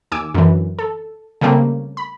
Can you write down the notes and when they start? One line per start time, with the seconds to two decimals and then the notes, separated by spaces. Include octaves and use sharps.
0.11 D#2 G#5 D6 E6
0.34 F#2 D3 E3
0.79 A4
1.41 C#3 G3 A3 A#3 C4
1.97 B5